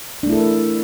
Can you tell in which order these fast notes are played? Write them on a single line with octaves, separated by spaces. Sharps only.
D4 A3 E4 A4 A#4